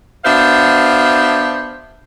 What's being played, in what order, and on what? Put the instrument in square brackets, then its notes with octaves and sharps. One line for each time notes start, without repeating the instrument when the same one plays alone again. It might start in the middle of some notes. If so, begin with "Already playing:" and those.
[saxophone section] B3 D4 F#4 C5 E5 F5